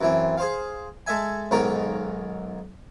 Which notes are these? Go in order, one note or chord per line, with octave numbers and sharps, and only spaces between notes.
F#2 E3 C4
G#4 C5 F5
G#3 A4 E5 G#5
B1 G#2 D#3 C#4 A#4 A#5